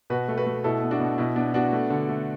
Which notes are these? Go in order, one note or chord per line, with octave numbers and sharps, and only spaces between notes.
B2 F#4 B4
A3
F#4 B4
A3
B2 E4 A4
B3
D4 F#4
B2
B2 E4
B3 D4
B3 D4 F#4
A3
D3
A3